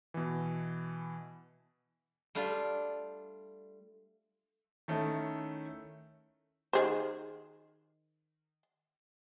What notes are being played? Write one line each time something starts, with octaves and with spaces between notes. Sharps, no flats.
B2 E3
G3 A3 D4 F4
D#3 A3 C#4 E4 A4
D#3 G#4 C5